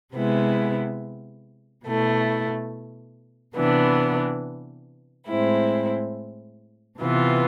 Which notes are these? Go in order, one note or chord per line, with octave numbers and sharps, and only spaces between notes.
C3 G#3 B3 E4
B2 A3 E4
C3 E3 B3 D4
A2 G#3 C4 E4
C3 E3 B3 F4